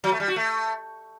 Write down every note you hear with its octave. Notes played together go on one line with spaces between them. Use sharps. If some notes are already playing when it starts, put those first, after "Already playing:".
F#3
A3
G3
F#4
A3